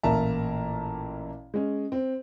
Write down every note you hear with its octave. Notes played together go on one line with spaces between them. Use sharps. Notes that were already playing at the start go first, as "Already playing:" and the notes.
A1 A#2 A#4 E5 A5 A#5
G#3 C#4
C4